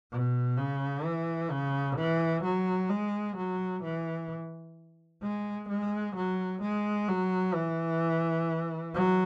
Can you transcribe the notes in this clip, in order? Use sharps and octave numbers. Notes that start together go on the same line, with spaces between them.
B2
C#3
E3
C#3
E3
F#3
G#3
F#3
E3
G#3
G#3
F#3
G#3
F#3
E3
F#3